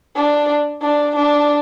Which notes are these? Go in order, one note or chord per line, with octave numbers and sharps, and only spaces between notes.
D4
D4
D4